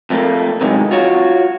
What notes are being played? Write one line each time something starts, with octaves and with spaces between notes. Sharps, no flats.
F2 A3 A#3
C3 D#3 E3 F#3 G#3 C#4
F4 F#4 C#5